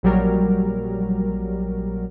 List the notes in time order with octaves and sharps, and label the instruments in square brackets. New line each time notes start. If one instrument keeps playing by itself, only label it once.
[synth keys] A#1 F#3 G3 A#4